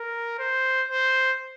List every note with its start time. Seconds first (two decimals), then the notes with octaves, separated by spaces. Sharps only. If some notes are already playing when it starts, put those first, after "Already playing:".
Already playing: A#4
0.39 C5
0.89 C5